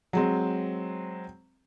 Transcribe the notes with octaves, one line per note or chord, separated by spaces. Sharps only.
F#3 G#3 C4